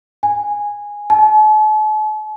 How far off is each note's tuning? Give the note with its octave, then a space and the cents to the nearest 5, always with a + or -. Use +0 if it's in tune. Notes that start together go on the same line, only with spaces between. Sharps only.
G#5 -10
A5 -45